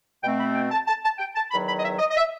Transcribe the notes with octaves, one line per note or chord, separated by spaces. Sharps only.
B2 A3 C4 G5
B5
G5
A5
A5
A5
G5
A5
E2 D#3 F#3 B5
B5
D#5
E5
D#5
D#5
E5